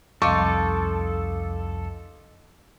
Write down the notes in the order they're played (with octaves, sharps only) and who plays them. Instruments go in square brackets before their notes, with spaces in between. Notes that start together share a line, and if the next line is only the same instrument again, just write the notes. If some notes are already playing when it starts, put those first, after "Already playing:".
[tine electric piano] C2 F2 [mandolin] D#4 F4 [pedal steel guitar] A4 [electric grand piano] C#6 D6